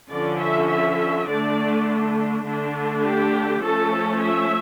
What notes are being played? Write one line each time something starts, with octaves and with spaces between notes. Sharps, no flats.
D3 F3 C#4 D5
E5
E5
D3 A3 D4 D5
D3 A3 D4
G4
F3 A3 C#4 A4
E5